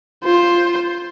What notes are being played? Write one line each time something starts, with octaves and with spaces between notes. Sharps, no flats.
F4 C5